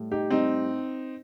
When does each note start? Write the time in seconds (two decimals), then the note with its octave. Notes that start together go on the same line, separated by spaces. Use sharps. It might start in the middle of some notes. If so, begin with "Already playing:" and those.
Already playing: A2 G3
0.11 D#4 G4
0.30 G3 C4 D#4